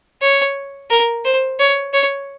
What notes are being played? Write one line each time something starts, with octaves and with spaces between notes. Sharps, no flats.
C#5
A#4
C5
C#5
C#5